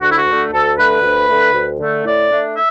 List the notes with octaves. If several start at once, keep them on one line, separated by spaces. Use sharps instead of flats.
D2 F#4
E4
F#4
D3 A3
D2 A4
D3 A3 B4
D2
D3 A3
D2
D3 A3
A2 D5
A3 D4
E5